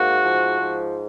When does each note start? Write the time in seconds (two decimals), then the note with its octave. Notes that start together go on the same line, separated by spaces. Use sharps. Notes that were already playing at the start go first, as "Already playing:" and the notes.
Already playing: G#2 A#3 F#4
0.24 F3
0.61 G#2